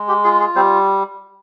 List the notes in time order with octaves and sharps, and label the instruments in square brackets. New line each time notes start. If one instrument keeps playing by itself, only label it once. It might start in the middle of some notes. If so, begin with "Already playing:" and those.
Already playing: [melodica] G#3
G4
F4 G#4
G#4
G3 C4 C5